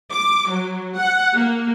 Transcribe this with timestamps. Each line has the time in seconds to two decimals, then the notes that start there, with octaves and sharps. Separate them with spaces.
0.12 D6
0.51 F#3
0.98 F#5
1.35 A#3